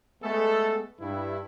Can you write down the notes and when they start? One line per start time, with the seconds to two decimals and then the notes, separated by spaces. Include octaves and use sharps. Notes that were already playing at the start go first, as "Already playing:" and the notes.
0.23 G#3 A3 B3 G#4 A4
1.00 G2 E4